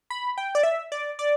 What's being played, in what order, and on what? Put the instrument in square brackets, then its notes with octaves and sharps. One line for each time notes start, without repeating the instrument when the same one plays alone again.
[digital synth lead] B5
G5
D5
E5
D5
D5